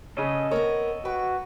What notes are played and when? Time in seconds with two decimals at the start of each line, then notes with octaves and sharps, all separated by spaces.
0.17 C#3 C#4 A4 D#5
0.51 B3 C4 A#4 C#5
1.05 F#4 B4 G5